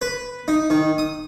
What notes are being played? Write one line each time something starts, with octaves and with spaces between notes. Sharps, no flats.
B4
D#4
D#3
D#6